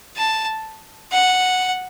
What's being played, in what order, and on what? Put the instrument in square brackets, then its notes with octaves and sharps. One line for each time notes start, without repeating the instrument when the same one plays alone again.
[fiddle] A5
F#5